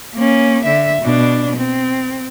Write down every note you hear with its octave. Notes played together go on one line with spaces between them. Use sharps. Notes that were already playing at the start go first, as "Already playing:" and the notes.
A#3 C#4
D3 E5
B2 D4
C4